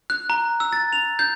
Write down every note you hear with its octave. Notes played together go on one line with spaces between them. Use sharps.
F#6
A#5
E6
A6
F7
G6